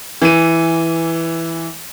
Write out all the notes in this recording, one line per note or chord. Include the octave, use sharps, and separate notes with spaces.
E3 D#7